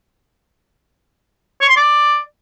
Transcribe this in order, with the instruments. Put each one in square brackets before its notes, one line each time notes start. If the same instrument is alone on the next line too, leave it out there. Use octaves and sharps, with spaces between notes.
[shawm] C#5
C6
D5